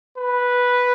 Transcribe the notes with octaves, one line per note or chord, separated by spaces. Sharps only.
B4